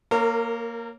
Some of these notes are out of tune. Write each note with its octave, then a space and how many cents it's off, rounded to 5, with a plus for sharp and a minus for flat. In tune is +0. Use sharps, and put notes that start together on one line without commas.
A#3 +0 A#4 -30 C#5 -5